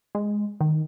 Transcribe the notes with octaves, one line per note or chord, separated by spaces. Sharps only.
G#3
D#3